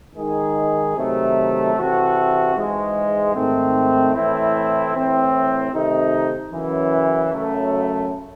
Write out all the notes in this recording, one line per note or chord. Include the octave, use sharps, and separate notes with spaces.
D#3 G#3 D#4 G#4
C3 D#3 F#3 A3
C3 E3 C4 F#4 A4
G#2 E3 G#3
G#2 D#3 A3 C4
A2 E3 A3 C4 E4
A2 E3 C4
C3 D#3 A3 D#4
F#2 C#3 E3
F#2 C#3 F#3 A3